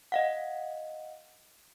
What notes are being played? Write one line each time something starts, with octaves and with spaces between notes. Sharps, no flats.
D#5 F5 F#5